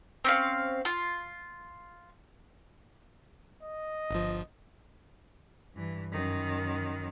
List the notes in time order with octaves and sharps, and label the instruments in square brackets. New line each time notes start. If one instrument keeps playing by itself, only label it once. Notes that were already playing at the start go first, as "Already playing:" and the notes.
[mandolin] C4 C#4 F5
F4
[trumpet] D#5
[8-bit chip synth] G1 F3
[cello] G2 E3
F#2 D#3